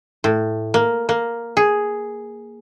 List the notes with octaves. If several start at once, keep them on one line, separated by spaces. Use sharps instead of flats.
A2
A#3
A#3
G#4